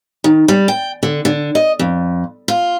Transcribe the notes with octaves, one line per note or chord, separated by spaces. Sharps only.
D#3
G3
G5
D3
D3
D#5
F2
F4